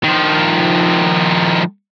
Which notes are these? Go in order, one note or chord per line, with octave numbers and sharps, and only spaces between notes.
D#3 F3